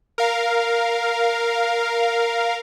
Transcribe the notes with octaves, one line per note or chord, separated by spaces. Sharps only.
A#4 F5